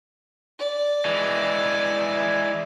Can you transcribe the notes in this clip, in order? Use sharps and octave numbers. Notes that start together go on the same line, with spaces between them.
D5
E3 G#3